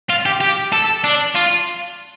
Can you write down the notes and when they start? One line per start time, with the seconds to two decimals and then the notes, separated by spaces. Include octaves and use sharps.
0.10 F4
0.26 G4
0.41 G4
0.73 A4
1.04 D4
1.35 F4